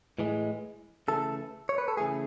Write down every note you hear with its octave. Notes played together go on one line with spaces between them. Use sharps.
A2 E3 G#3
C#3 E3 A3 A4
C#5
B4
A4
C#3 E3 A3 G#4